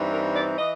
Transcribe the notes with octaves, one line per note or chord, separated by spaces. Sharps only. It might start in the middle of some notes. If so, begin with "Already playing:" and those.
Already playing: G2 E3 G3 C4 D#4
A#4
D5
E3 D#5